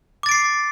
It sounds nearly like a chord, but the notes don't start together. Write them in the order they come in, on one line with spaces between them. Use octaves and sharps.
D6 A6 D7 C7